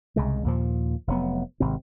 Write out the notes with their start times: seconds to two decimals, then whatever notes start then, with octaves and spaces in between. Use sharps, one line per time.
0.16 C2 C#3 G#3
0.44 D#2 A#2 F3
1.07 F1 F#3 B3
1.60 G#1 C3 C4